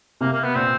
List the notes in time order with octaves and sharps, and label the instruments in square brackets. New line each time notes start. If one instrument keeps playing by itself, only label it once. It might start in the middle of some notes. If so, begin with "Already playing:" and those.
[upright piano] C3 [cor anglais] A#3
[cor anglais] A#3
B3
[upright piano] A#2 [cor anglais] C4